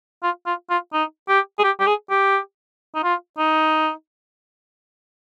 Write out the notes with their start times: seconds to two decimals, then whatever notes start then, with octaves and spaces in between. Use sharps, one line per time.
0.23 F4
0.46 F4
0.70 F4
0.93 D#4
1.28 G4
1.58 G#4
1.64 G4
1.80 G4
1.87 G#4
2.10 G4
2.95 D#4
3.03 F4
3.38 D#4